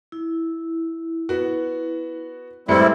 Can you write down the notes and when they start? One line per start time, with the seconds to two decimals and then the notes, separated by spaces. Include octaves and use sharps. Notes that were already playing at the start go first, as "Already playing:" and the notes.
0.12 E4
1.29 B3 F#4
2.68 A2 G3 G#3 C4 E4 B4 C#7